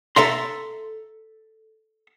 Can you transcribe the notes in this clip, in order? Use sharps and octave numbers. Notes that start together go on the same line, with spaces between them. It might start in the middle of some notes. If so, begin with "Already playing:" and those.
A4 E5 A#5 C6